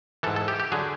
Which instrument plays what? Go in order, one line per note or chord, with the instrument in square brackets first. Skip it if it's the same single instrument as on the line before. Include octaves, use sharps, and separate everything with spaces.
[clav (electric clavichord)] E3 A4
G#2
A4
G4
G4
D3 F#3 G#4